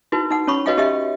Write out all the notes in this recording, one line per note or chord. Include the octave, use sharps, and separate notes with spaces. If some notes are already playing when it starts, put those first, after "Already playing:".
D#4 E4 F#4 B4
D#4 F#5
C#4 C#5 B5 C#6
F#4 B4 C#5 D#5 F5 G5
C#4 G4 D#5 E5 G5